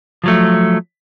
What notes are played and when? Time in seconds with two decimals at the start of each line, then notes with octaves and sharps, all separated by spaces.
0.24 F3 F#3 A3